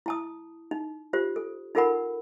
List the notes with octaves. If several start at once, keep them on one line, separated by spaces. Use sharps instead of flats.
E4 A5 D#6
D#4
F4 G4 C5
A4
D#4 F4 A4 A#4 F#5 B5